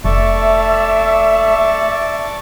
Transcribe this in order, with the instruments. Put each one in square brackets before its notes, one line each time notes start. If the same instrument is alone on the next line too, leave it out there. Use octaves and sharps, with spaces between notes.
[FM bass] F1 [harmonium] A3 [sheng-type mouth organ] D5 A5 C#6 [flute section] E5 E6